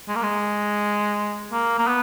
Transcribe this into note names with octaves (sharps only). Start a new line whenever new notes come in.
G#3
A#3
G#3
A#3
A#3
B3